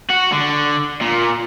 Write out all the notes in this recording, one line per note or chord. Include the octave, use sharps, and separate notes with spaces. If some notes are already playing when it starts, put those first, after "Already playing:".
F#4
D3
A#2